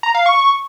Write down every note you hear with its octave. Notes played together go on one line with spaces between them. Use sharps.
A#5
F5
C#6